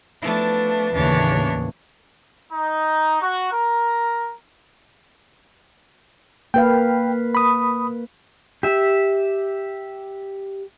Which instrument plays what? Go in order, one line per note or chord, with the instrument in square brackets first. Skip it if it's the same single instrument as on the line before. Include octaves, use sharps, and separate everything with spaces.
[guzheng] F3 B3 E4 [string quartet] A3 D4 A5
[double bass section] D#2 A2 C#3 [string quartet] E3 D4 C#5
[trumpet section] D#4
F#4
A#4
[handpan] A#3 B4 F5 [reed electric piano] G5
[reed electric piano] B5 D#6
[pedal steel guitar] G4 E5